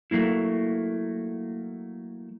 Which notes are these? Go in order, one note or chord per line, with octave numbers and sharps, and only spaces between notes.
F#3 A3 A#3 E4